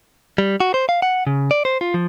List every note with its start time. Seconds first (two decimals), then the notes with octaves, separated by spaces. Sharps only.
0.38 G3
0.60 F#4
0.74 C5
0.89 F5
1.02 F#5
1.27 C#3
1.51 D5
1.65 C5
1.81 F4
1.94 F3